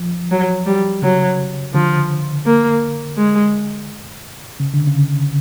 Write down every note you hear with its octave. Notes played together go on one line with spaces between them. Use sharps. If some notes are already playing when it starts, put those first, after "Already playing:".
Already playing: F3
F#3
G3
C#3 F#3
D3 F3
A#3
G#3
C#3
D3
C#3